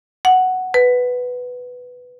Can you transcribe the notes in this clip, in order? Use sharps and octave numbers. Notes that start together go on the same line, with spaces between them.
F#5
B4